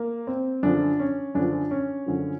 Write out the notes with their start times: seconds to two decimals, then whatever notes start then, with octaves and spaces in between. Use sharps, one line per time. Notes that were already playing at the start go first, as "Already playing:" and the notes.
Already playing: A#3
0.27 C4
0.63 F#2 D3 F3 D4
1.00 C#4
1.35 F#2 D3 F3 D4
1.71 C#4
2.06 F#2 D3 F3